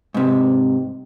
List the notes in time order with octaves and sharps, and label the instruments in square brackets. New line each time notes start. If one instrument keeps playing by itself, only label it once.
[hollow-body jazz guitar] G#2 C3